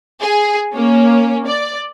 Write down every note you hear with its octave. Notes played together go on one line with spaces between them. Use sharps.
G#4
A#3 C#4
D5